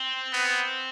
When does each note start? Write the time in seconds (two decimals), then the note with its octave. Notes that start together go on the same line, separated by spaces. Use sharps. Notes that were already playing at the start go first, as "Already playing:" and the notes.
Already playing: C4
0.33 B3